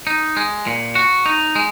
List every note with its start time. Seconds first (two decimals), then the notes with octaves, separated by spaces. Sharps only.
0.07 D#4
0.37 G#3
0.67 A#2
0.95 F#4
1.26 D#4
1.55 G#3